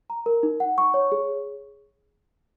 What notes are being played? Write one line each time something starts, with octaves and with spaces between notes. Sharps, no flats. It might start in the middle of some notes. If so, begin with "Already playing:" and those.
A#5
A#4
D#4
F#5
C#6
C#5
G#4